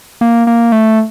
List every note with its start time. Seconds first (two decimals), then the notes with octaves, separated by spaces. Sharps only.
0.21 A#3
0.47 A#3
0.72 A3